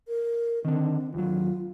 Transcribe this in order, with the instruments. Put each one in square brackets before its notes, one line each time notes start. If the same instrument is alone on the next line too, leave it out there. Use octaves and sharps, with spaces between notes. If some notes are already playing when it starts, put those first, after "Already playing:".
[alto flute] A#4
[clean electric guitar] D3 D#3 [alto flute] C4
[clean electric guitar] D#2 F#3 [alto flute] F4